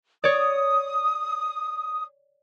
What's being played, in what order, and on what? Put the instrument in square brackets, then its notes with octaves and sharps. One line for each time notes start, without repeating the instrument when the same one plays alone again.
[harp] C#5 D5 [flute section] D#6